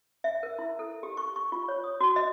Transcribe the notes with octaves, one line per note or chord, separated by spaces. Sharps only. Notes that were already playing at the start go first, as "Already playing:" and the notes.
E5
A#4
E4
A4
G4
C#6
C#6
F4
C#5
D#6
F#4
D#5